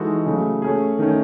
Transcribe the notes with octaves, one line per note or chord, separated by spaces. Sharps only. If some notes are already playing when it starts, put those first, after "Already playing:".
Already playing: E3 G#3 D#4 F#4 A4
C#3 F#3 A3
A3 C#4 G#4
D#3 A3 C#4